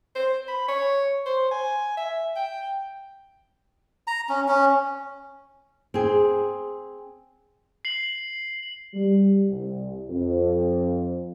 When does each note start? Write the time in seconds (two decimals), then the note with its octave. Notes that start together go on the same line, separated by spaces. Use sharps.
0.15 C5
0.48 B5
0.68 C#5
1.26 C5
1.51 G#5
1.97 E5
2.36 G5
4.07 A#5
4.29 C#4
4.48 C#4
5.94 C4 G#4
7.85 C7 F#7
8.94 G3
9.49 C2
10.10 F2